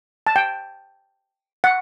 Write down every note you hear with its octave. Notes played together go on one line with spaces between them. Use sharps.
A5
G5
F#5